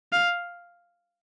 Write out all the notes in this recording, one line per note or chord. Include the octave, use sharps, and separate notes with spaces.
F5